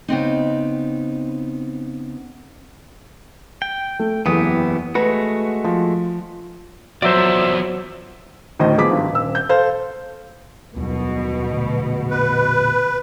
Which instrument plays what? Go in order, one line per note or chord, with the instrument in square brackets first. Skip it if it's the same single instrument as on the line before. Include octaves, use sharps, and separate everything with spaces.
[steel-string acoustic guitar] C#3 B3 C4 D#4
[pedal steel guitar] G5
[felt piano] A3
[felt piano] F#1 E2 D#6 [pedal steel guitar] E3 B3 G4
[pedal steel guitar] G#3 A3 F#4 [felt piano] B4
[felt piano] F3
[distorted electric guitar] E2 F3 [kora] F#3 [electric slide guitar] C5 D5 [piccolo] E5
[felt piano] D2 A2 D#3 C5 D#5
F3 B3 G#4 D6 B6
G#1 G2
D#1 E6
G6
A4 C5 F5
[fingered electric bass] D#2 F#3 G3 [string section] B2
[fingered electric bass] A#2 D3 A3
[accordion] B4